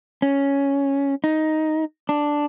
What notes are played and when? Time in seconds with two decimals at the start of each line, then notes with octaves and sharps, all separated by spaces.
0.22 C#4
1.24 D#4
2.09 D4